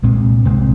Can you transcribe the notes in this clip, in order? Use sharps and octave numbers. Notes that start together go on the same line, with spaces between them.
C2 A#2 G#3 C4
C2 A#2 G#3 C4